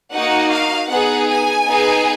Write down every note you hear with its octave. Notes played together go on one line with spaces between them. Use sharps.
A#3 D#4 F#4 F#5
F5
B3 D#4 G#4 F#5
G#5
B3 D#4 G#4